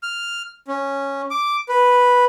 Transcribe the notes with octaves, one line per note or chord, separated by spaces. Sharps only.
F6
C#4
D6
B4